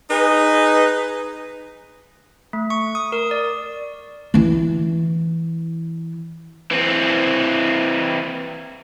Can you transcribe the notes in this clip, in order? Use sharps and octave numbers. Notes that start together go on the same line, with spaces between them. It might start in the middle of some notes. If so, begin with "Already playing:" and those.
D#4 G#4 B4
A3
C#6
D#6
A#4
D5
E3 E4
E3 C4